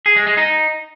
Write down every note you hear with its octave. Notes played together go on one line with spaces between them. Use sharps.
G#4
G#3
G#3
D#4